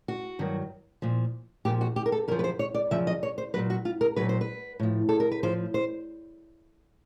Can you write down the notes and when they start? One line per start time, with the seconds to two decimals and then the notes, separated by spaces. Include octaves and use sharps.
0.08 F#4
0.39 G2 D#3 F#3
1.02 A#2 F3
1.65 A#2 F3 G4
1.81 F#4
1.96 G4
2.06 A#4
2.12 A4
2.28 F#2 C#3 F3 A#4
2.39 B4
2.44 C5
2.59 C#5
2.74 D5
2.91 F#2 C#3 F3 E5
3.07 D#5
3.23 C#5
3.38 C5
3.54 A#2 F#3 B4
3.70 F#4
3.85 F4
4.01 A#4
4.16 A#2 F#3 B4
4.29 C5
4.41 B4
4.80 A2 F3
5.09 A4
5.20 A#4
5.32 B4
5.43 A2 F3 C5
5.74 C5